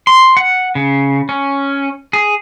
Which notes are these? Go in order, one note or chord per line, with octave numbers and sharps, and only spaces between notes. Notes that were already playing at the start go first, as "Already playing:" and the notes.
C6
F#5
C#3
C#4
G#4